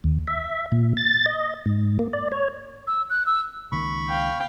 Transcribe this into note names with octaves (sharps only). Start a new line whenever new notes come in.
D#2
E5
A#2
A6
D#5
G#2
A#3
D5
C#5
E6
F#6
E6
C#2 D#3 A#3 B5 C#6
F5 G5